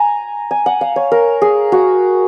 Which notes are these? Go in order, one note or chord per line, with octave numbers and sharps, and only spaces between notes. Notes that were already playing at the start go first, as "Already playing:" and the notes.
Already playing: G#5 A#5
G#5
F#5
F5
C#5
A#4
G#4
F#4